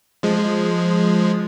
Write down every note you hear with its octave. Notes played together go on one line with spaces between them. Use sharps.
F3 G#3